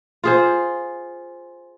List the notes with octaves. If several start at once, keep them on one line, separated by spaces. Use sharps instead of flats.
F4 G#4 C5